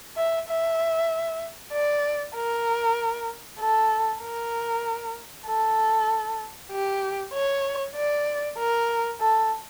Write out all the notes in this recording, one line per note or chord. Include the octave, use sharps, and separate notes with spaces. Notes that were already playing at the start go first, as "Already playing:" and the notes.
E5
E5
D5
A#4
A4
A#4
A4
G4
C#5
D5
A#4
A4